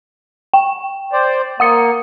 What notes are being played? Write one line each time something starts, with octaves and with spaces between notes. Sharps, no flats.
G5
C5 D5
A#3 F#5 D#6 C#7